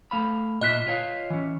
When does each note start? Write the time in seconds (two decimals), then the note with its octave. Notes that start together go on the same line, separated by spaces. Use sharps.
0.11 A3 F5 B5
0.61 A#2 F4 D#5 E5 F#6 B6
0.87 F4 C#5 F5
1.30 E3 C#4